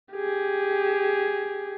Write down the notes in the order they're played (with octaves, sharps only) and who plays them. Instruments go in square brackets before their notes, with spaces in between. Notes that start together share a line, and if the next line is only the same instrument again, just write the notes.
[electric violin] G4 G#4